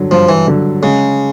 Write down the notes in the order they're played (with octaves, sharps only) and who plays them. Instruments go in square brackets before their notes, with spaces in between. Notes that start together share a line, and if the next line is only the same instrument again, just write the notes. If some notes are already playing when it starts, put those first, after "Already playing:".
Already playing: [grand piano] G2 D3 F#3
[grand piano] G2 [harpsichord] F3
[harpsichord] E3
[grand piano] D3 F#3
[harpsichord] C#3 [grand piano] G#3